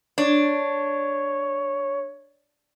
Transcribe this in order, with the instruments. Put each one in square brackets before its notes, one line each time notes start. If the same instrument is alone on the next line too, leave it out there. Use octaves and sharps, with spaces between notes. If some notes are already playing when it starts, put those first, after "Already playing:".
[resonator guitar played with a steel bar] D4 [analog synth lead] C#5